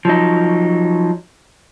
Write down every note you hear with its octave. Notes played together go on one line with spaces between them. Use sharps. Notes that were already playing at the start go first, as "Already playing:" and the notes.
F3 F#3 D#4